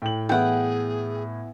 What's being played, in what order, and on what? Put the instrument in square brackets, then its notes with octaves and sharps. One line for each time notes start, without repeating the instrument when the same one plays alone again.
[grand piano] A2 F#7 [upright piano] G5
[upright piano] E3 B3 E4 [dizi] G#4 [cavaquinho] F#5 G5